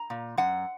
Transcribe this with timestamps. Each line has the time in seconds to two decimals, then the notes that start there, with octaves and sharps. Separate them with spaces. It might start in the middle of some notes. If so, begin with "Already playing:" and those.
Already playing: A#5
0.10 A#2
0.37 F#2 F#5